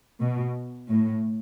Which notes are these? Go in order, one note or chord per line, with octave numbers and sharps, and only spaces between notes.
B2
A2